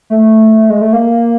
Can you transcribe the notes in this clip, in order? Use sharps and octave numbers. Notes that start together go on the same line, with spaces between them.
A3
G#3
A3
A#3